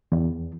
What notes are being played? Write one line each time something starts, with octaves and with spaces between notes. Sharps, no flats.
E2